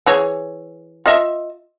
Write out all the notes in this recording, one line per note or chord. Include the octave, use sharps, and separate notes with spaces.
E3 G#4 C#5
F4 D#5 E5